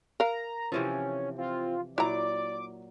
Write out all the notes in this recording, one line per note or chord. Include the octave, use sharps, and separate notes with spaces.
A#4 F5 A#5
C3 E3 F3 C#4
C4 F4
A#2 F#3 E4 D5 A#5 D6